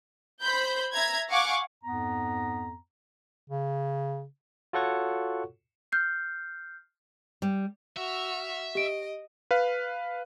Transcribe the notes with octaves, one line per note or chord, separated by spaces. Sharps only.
C5 B5 G6
E5 A#5 G#6
F5 F#5 G#5 C#6 D6
F2 G#2 B3 A#5
C#3
F4 F#4 A4 C#5 F#5 C#6
F6 G6 C7
G3
F#4 E5 F6
G4 D#5 D7
B4 F5